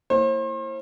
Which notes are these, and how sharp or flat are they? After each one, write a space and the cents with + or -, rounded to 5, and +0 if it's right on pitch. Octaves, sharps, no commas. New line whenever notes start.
A#3 -35 E4 +0 C5 +40